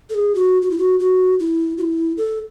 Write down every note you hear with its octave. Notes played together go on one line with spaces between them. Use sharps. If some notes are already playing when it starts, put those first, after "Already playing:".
A4
G#4
F#4
F#4
E4
F#4
F#4
E4
F#4
E4
A4